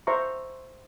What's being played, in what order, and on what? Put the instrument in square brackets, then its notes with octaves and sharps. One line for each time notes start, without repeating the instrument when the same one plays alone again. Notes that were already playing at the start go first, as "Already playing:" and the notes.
[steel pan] C5 E5 A#5 C#6